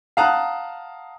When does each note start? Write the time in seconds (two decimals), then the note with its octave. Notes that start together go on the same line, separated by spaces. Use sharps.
0.17 F5 F#5 A5 A#5 D#6 F#6